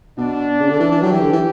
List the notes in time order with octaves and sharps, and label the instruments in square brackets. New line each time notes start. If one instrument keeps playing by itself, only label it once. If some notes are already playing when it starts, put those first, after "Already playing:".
[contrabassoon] B2 [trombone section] D4
[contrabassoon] C#3
D3
E3
E3
[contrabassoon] F#3 [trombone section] G4
[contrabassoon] E3
D3
E3